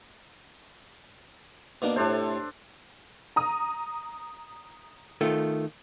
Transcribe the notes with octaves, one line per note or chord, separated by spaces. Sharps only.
B2 A#3 D4
A2 C3 D4 A4 C5
A#5 D#6
D#3 A3 F4